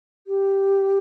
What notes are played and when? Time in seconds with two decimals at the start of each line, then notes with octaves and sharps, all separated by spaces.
0.27 G4